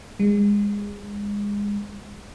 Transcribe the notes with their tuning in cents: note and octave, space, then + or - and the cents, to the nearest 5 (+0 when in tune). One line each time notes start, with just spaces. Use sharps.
G#3 -25